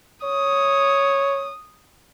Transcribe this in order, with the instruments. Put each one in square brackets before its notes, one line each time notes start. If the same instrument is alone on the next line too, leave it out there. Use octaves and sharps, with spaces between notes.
[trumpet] C#5 [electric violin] D#6